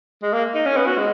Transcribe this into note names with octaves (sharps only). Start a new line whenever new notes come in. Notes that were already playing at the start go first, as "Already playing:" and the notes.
G#3
A#3
D#4
C#4
B3
F#4
G#3